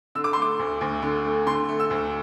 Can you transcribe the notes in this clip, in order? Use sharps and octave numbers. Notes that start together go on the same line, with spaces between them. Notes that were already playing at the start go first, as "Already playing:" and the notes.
D3 E6
D6
A3 C6
D6
D2
D2
D3
A3
D3 C6
A3
E6
D2